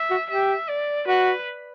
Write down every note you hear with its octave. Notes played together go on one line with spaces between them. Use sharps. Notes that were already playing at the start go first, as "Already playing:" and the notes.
Already playing: E5
F#4
G4 E5
D5
F#4 B4